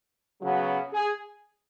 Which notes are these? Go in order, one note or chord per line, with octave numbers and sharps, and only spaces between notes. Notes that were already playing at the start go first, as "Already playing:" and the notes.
C#3 F#3 B3
G#4